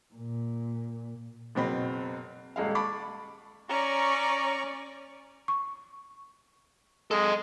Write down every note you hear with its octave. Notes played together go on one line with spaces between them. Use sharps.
A#2
F#1 B2 C4 B5
D#1 G#3 F5
A5 B5 C#6 D6
C#4 D5 A#5 C#6
C#6
G#3 A4 D#5